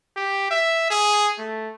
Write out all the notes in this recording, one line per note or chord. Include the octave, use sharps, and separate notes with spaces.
G4
E5
G#4
A3